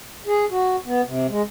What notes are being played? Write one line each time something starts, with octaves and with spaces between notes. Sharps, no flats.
G#4
F#4
B3
C3
G#3